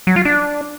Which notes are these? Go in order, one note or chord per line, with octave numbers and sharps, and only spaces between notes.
F#3
F4
D4